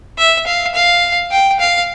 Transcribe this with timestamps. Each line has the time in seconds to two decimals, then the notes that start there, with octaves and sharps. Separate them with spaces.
0.18 E5
0.46 F5
0.75 F5
1.31 G5
1.60 F5